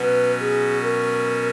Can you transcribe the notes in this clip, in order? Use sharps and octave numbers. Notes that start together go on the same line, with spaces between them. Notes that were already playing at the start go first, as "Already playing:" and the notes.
Already playing: B2 F#3 C#4 B4
G#4
A#4